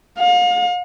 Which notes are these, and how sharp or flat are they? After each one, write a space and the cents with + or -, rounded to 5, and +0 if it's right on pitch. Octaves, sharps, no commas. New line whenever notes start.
F5 +40